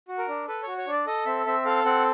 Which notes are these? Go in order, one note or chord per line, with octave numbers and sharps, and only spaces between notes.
F#4
A#4
D4
A4 B4
F#4 C#5
C#5
D4
D5
A4 D#5
C4 E5
C4 E5
A4 F5
C4 F#5